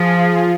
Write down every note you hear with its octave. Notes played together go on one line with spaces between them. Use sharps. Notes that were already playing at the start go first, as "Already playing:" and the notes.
Already playing: F3 F4 G#4